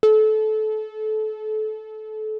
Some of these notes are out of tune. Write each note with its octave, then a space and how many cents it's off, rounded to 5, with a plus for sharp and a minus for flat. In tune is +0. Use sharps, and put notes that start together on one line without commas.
A4 -25